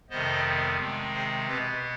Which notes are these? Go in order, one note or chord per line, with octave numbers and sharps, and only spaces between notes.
F2 C3 D#3 G3 B3 C5 D#5
C3 D#3 G#3 C4
G#4 C5
B2 B3 G4 B4